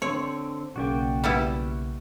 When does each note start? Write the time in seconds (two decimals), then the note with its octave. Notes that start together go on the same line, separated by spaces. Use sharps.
0.02 D3 C4 C#5
0.76 B1 C#3 A#3 F#4 D5 G5
1.24 G3 B3 E4